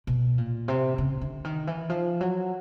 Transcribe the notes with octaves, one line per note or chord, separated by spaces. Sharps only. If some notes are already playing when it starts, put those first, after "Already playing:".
B2
A#2
C3
C#3
D3
D#3
E3
F3
F#3